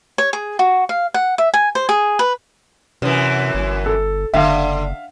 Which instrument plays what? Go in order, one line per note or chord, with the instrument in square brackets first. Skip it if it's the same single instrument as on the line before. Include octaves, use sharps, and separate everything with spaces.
[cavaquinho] C#5
G#4
F#4
F5
F#5
E5
G#5
C5
G#4
B4
[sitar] F#2 E3 [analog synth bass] C3
[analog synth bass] G1
[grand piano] A4
[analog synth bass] F#1 [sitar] D3 [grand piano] E5 F5